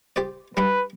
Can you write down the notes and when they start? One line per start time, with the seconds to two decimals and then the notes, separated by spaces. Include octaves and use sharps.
0.16 G4 C5 D5
0.57 G3 D4 B4 B5